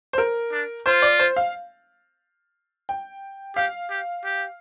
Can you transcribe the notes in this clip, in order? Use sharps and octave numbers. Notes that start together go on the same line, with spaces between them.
C5
A#4
D4
F4 C5
D5
C5
F5
G5
G4 F5
G4
G4